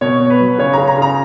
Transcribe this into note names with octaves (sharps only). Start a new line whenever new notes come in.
B2 C#5
B2
B4
F#3
C#3 C#5
C#3 A#5
A#5
C#3 A#5